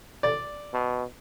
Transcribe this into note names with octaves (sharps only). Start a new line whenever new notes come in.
D5
B2